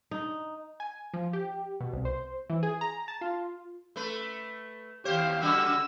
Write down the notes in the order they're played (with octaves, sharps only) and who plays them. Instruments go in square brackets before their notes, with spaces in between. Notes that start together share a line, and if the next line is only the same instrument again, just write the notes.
[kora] D#4
[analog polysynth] G#5
F3
G4
B2
C2
C5
E3
G#4
A#5
A5
F4
[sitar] A3 B4
[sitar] D#2 C5 [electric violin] G4 F5
[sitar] C#3 G3 F#4 [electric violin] E6